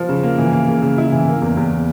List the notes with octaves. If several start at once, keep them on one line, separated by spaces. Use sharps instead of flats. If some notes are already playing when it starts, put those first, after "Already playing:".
Already playing: F3
C#3
A#3
E3
A#3
C#3
C#3
E4
E3
A#3
E2
E2